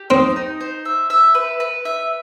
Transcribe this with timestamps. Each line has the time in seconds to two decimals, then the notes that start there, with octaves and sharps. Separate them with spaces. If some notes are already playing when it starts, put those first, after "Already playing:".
Already playing: G4
0.10 C4 D#4
0.36 D#4
0.61 C5
0.85 E5
1.10 E5
1.35 B4
1.60 B4
1.85 E5